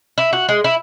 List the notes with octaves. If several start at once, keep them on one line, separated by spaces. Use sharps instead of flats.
E4
F#4
G#3
E4